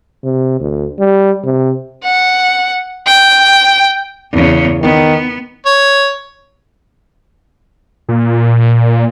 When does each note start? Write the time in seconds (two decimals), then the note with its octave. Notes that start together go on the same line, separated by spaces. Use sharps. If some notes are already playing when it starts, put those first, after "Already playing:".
0.23 C3
0.60 D2
0.99 G3
1.44 C3
2.03 F#5
3.06 G5
4.32 E2 C#3
4.82 D#3 B3
5.66 C#5
8.09 A#2